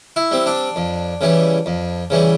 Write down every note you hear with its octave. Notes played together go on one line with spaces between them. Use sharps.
E4
G3 C4
D4
F2
C#3 E3 G3
F2
C#3 E3 G3